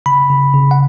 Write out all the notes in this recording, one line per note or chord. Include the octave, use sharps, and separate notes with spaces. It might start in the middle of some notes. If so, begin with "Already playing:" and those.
C#3 B5
C#3
C#3
F#5